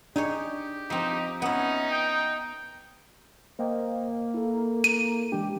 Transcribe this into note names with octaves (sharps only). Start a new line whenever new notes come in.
D4 D#4 G4 G#4 C#5
F3 C4 D#4
B3 C#4 D#4 E4
G5
A#3 C5 D#5 G5
E4 A4
D#7
E3 G#3 D4 G4